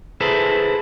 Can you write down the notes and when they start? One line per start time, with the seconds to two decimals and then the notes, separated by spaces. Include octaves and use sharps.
0.21 E4 G#4 A4 B4 C5